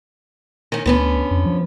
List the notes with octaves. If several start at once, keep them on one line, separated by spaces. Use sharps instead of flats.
D#3 C#4
D2 D3 B3 C#4
F2
F3